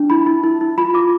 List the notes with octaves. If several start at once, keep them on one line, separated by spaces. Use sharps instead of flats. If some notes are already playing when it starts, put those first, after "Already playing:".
Already playing: D4
E4 B5
E4
E4
E4
F4 B5
F4 D6